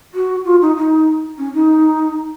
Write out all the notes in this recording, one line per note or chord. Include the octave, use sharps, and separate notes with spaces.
F#4
F4
D#4
D#4
C#4
D#4